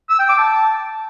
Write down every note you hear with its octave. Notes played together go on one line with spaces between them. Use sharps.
E6
G5
D6
A5